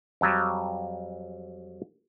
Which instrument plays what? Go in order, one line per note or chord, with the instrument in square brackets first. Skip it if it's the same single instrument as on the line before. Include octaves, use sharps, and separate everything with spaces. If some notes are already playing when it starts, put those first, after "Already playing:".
[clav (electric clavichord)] F2 F#3 G3